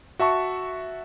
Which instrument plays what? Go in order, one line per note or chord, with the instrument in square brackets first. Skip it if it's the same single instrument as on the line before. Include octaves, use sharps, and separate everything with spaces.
[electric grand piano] F#4 E5 A5 C#6